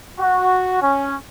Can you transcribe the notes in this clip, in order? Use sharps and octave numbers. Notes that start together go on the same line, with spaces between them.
F#4
C#4